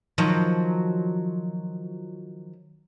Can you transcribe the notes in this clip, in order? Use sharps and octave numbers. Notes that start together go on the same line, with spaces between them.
D#3 F3 F#3